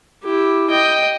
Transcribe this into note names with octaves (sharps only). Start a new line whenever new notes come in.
E4 G4
D#5 G5